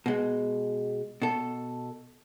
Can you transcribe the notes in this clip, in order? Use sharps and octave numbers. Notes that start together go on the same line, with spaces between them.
B2 G#3
B2 A4